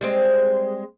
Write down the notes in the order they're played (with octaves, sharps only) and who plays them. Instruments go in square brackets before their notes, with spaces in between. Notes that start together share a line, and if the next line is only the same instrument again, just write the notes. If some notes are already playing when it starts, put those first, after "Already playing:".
[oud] G3 G#3 C4